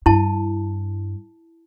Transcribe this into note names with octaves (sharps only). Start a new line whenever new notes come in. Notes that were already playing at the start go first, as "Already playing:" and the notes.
G2 E4 A5